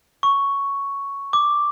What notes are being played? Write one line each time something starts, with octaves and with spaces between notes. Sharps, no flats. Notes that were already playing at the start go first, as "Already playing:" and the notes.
C#6
D6